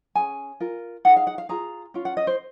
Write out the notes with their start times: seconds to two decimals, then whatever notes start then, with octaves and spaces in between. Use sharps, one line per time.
0.15 C#4 G#4 G#5
0.60 F4 A#4
1.05 D#4 G#4 F#5
1.16 F5
1.27 F#5
1.38 F5
1.49 F4 G#4 A#5
1.94 C#4 F4
2.05 F#5
2.17 D#5
2.27 C5